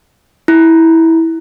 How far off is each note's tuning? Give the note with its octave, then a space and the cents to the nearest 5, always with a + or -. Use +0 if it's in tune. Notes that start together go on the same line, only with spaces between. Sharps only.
E4 -15